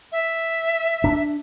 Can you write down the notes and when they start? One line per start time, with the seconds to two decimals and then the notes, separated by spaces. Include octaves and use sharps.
0.12 E5
1.04 D4